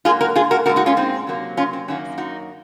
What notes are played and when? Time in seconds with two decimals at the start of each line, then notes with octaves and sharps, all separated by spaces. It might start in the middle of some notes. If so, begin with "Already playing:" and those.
0.05 G#2 F#3 A#3 F4 G#4
0.21 F#4 A#4
0.36 F4 G#4
0.51 F#4 A#4
0.66 A#2 F#4 A#4
0.69 G#3
0.76 D#4 F#4
0.86 C#4 F4
0.97 C4 D#4
1.27 C3 F#3 A#3
1.57 C#4 F4
1.73 C4
1.88 F#2 D#3 F#3 A#3 C#4
2.18 D#4 F#4